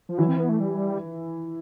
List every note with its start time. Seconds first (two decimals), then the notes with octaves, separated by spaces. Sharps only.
0.09 F3
0.18 E3 F#3 E4
0.28 C4
0.40 B3
0.49 A3
0.60 G3